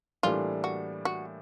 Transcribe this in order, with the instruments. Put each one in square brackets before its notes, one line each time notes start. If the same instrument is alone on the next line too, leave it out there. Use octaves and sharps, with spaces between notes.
[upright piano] A2 E3 G3 A#3 D4 [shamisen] F4
[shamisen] F#4
F#4